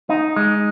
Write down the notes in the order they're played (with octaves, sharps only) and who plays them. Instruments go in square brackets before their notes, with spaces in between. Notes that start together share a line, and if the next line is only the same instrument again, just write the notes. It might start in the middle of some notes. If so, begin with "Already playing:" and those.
[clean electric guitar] D#4
G#3